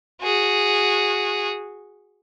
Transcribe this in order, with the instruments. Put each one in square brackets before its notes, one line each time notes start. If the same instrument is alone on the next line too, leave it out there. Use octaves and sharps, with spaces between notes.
[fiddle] F#4 G#4